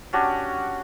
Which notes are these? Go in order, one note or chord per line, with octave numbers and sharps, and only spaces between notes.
C#4 D4 F#4 G4